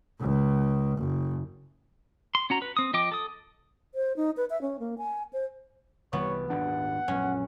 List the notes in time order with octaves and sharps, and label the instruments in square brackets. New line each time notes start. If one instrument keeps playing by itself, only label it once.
[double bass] C#2
F#1
[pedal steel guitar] C6
C#4 F#4 A#5
B4
C4 D#6
F3 D#5 G5 D6
A4 D#6
[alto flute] C5
D#4
B4
E5
C#4
A#3
G#5
C5
[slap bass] C2 E3 G3 [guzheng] B3 [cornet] C#5
[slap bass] D#1 G#1 D4 [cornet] F#5
[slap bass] A#1 F#2 [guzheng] C#4